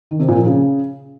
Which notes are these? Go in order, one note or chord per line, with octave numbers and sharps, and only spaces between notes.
D#3
C3
A#2
F3
C#3